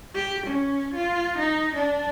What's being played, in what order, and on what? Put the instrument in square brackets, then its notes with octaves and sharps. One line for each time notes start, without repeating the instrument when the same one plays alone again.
[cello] G4
C#4
F4
D#4
D4